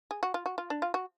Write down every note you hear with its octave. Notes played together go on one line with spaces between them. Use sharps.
G#4
F#4
F4
F#4
F4
D4
F4
F#4